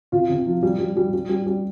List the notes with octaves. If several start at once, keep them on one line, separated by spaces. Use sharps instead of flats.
C3 F4
C3
F3
G3
G3
G3
G3
G3
G3